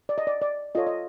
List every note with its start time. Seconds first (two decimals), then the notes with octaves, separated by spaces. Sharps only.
0.09 D5
0.18 D#5
0.27 D5
0.42 D5
0.75 F4 A4 C#5 D#5
0.87 D#5